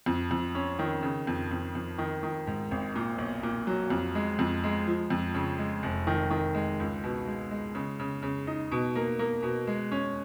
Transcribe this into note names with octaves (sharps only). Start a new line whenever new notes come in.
F2
F2
C#4
D#3
C#3
F2
F2
F2
D#3
D#3
G#2
G#1
A#2
B1
A#2
F#3
F2
G#3
F2
G#3
F3
F2
C#3
G#3
F1
D#3
D#3
G#3
C#2
B2
G#3
G#3
C#3
C#3
C#3
D#4
B2
A#3
A#3
B2
G#3
C#4